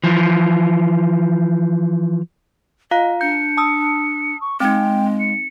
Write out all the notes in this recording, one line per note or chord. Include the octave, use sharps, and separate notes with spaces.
E3 F3
F4 D#5 F5 A#5
D4 G6 C#7
A5 D#6 E6
C#6
G#3 C4 D#4 G5
C#7